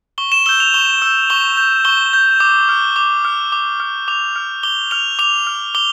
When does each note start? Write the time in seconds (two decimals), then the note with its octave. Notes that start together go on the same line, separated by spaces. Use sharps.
0.18 C#6 G7
0.32 E7
0.46 E6 G6 G7
0.60 F7
0.74 C#6 G7
1.02 E6 G6
1.30 C#6 G7
1.57 G6
1.85 C#6 G7
2.13 G6
2.40 D6
2.69 F6
2.96 D6
3.25 F6
3.52 D6
3.80 F6
4.08 D6 F7
4.36 F6
4.63 D6 G7
4.91 F6 F7
5.19 D6 F7
5.47 F6
5.75 D6 G7